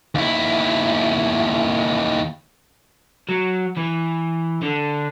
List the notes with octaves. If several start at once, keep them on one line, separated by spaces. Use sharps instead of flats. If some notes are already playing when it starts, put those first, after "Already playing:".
D#2 E4
F#3
E3
D3